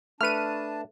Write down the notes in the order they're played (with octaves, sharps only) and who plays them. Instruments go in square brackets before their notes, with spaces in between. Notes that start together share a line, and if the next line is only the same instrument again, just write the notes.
[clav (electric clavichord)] A3 B4 [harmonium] D4 A5 [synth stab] F6 D#7